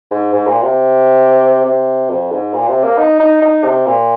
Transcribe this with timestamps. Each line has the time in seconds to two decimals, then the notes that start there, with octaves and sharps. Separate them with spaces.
0.11 G#2
0.33 G#2
0.47 A#2
0.62 C3
1.65 C3
2.10 F2
2.32 G#2
2.54 A#2
2.68 C3
2.84 A#3
2.98 D#4
3.20 D#4
3.42 D#4
3.64 C3
3.86 A#2